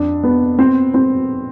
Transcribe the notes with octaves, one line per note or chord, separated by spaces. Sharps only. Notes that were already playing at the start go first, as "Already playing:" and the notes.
Already playing: F2 D4
B3
C4
C4